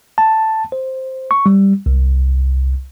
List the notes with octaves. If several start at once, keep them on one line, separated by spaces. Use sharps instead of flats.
A5
C5
C#6
G3
C2